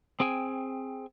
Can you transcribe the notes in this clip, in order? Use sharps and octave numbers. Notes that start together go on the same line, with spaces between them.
C4 G#4 G5 G#5